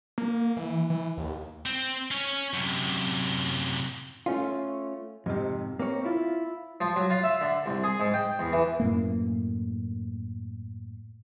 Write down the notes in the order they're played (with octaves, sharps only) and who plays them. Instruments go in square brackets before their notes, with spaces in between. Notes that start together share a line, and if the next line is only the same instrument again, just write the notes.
[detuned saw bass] A#3
E3
E3
D#2
[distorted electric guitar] C4
C#4 C#5
F#2 C3
[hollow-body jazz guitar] A3 C#4 F4
F2 G#2 C3
A#3 C4 C#5
E4 F4
[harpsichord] F3
F#3
F4
E5
D3
C2
G#4
G#2
G5
E2
E3
[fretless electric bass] F#2 A2 A#3